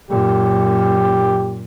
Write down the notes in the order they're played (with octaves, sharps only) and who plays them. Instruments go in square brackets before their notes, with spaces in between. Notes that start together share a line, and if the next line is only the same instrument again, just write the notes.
[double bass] F#2 A#2 [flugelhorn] G4